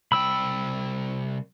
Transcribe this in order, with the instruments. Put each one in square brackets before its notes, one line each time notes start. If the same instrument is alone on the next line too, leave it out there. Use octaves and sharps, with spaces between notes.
[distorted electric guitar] C2 G5 [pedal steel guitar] B5 E6